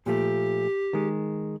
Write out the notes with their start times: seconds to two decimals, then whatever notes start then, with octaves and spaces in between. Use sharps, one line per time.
0.06 A#2 F3 A3 G4
0.93 D#3 G#3